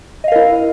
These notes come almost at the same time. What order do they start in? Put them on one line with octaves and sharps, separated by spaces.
D#5 F5 A#4 E4